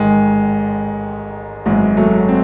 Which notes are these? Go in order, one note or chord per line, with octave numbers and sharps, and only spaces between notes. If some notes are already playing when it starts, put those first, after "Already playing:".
Already playing: A1 G#2 D#3 G#3
G#1 F#2 E3 G#3
F#3 A3
C4